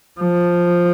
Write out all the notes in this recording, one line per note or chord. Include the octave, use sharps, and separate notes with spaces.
F3